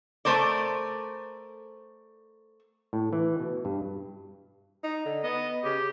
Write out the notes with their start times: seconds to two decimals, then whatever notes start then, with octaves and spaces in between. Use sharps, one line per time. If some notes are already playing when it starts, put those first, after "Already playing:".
0.25 A3 A#4 C5 D5
2.93 A2
3.13 E3
3.40 B2
3.65 G2
4.84 D#4
5.06 D3
5.23 B3 D#5
5.64 C#3 G4